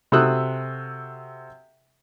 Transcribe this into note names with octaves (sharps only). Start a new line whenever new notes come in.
C3 F#4 A4 D#6 E6 F#6